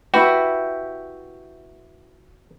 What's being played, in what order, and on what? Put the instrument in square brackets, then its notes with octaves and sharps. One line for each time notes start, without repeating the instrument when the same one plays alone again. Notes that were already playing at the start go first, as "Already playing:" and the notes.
[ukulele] E4 B4 [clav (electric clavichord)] F#4 [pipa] G4